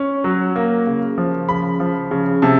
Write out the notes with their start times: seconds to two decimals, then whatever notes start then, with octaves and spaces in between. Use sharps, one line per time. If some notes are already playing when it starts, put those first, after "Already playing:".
Already playing: C#4
0.24 F#3
0.56 A#3
0.87 C#3
1.18 F3
1.49 C#3 B5
1.80 F3
2.11 C#3
2.42 C3 A5